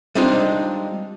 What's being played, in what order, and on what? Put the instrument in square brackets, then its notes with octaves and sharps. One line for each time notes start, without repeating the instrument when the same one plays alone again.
[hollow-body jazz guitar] G3 G#3 C4 D4 D#4 F4